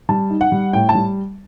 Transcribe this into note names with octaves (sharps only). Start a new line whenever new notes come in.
G3 A5
D#4
F#5
G3
A2 G5
A5
G3